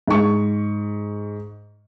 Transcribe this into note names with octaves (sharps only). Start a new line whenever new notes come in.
G#2 C#6